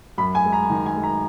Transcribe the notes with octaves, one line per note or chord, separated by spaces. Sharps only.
F#2 B5
G#5
G#3
A#5
D#3
G#5
G#3
A#5